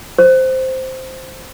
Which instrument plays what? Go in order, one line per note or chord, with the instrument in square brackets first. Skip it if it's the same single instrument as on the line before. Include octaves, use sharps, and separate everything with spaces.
[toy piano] C5